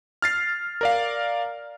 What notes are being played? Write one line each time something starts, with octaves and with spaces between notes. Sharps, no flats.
F6 A6 C7
A#4 D5 F5